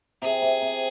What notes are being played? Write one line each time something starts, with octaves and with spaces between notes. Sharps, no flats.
C3 G#4
C3
C3